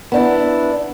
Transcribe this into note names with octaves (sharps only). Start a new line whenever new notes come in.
B3 D4 E4